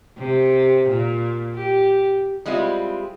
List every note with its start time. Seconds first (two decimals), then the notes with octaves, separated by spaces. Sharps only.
0.18 C3
0.89 A#2
1.55 G4
2.46 G3 G#3 C4 E4 F4